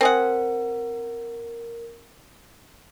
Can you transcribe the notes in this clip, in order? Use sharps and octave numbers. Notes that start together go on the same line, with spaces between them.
C4 G#4 A#4 F#5